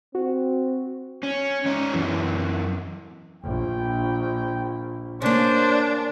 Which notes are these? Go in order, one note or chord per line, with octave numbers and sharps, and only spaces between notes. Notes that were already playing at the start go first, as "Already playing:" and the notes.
C4 F#4
C#4
C#4 D#4
F#2 E3
A#1 G5
C#3 A#3 D4 C5